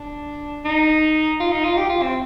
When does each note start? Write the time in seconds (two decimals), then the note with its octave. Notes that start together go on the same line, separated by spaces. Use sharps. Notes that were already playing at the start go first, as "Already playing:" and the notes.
Already playing: D4
0.65 D#4
1.40 F4
1.52 D#4
1.65 F4
1.77 G4
1.90 F4
2.02 C4